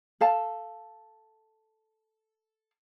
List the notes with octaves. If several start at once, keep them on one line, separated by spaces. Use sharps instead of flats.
A4 F5 A5